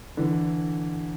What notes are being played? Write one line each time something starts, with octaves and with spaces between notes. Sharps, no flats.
D3 E3